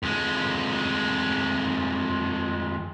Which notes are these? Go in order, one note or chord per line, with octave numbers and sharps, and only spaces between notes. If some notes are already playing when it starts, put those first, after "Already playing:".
F2 G#3